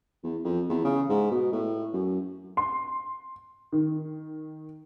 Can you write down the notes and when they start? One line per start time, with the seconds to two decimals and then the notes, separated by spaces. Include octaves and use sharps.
0.24 E2
0.44 F2
0.69 E2
0.84 C#3
1.09 G#2
1.31 B2
1.52 A2
1.93 F#2
2.57 C6
3.72 D#3